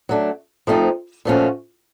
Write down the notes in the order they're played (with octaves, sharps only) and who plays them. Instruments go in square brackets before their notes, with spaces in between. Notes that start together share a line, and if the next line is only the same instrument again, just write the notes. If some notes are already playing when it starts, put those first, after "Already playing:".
[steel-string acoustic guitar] F#3 A3 D4
F3 A3 C4 D#4
A#2 F3 A3 C#4 F#4